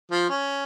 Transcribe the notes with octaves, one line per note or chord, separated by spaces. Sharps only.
F3
C#4